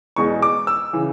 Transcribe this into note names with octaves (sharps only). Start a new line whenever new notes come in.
E2 B2 G#3 C#6
D6
E6
C#3 E3